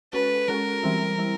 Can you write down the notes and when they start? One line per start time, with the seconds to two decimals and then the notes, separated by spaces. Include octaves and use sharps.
0.13 G#3 C#4 F#4 A4 B4
0.48 G#3 C#4 F#4 A4 A#4
0.83 E3 G3 C4 E4
1.18 E3 G3 C4 E4